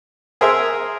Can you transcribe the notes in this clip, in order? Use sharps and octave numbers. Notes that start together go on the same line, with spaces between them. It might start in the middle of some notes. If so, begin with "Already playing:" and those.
G#4 A#4 C5 E5 A#5